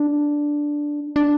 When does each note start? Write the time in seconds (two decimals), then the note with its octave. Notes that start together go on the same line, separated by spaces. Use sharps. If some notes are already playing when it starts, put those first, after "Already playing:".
Already playing: D4
1.16 D4